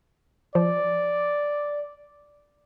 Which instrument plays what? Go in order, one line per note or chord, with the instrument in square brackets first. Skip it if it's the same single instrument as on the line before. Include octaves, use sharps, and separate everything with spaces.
[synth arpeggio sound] F3 [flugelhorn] D5